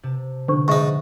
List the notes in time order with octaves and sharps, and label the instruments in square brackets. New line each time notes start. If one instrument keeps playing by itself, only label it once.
[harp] C3 A5
[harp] B2 F3 [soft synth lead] D3 [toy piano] C5 C#6
[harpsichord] G#2 D#4 [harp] C#5 F#5 [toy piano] E5 C#6